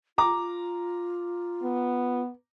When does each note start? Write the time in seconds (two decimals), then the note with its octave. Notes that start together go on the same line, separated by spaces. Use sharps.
0.18 F4 A#5 D6
1.63 B3